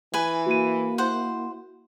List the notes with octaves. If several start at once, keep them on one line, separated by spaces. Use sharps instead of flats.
E3 B4 G#5
A#3 F#4 D#7
E4 C5 F#5